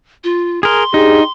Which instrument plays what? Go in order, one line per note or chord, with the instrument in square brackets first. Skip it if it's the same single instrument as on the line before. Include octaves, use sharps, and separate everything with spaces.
[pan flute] F4
[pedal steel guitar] G#4 A#4 [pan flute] C6
[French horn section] D4 G4 G#4 [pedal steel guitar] D#4